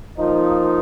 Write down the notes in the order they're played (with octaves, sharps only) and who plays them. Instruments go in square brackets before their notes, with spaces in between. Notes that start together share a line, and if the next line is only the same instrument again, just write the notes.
[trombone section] F3 A#3 D#4